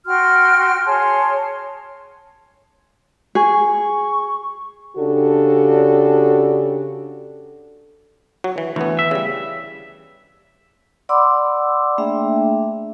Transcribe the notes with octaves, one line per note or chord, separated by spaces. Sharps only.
F#4 G5 C6 F6
G#4 C#5 A5 C6
G#4 C#6
C#3 D4 F#4 G4 A4
F#3 F#4
E3
D2 E3 B3
E5
C#3 G3
D5 F#5 B5 C6 D6 E6
A3 A#3 D4 G#4 E5 G5